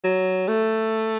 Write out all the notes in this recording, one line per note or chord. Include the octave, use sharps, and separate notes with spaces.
F#3
A3